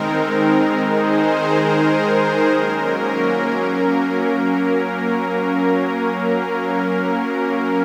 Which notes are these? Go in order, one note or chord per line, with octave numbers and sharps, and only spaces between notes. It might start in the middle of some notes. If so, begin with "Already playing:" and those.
Already playing: D#3 G#3 C4 D#4 A#4
D#3 G#3 D#4 G#4 C5
A#4
G#4 C5
G#4 C5
A#4
F#3 A#3 C#4 A#4